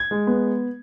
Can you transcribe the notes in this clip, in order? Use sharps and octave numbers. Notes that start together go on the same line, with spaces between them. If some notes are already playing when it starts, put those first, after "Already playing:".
Already playing: G#6
G#3
B3